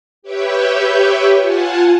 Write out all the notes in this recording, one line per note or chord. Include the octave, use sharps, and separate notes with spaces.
G4 B4 C#5 E5 G5
F4 F#5 G#5 A5